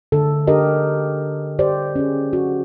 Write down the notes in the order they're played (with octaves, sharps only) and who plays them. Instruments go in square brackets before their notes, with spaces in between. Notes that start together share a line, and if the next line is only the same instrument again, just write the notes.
[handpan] D3 A4
D4 G4 A#4 D#5
G4 C5 D5
C#4 G#4
F#4